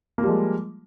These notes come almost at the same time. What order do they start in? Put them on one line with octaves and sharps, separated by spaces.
A#3 F4 G3 F3 G#3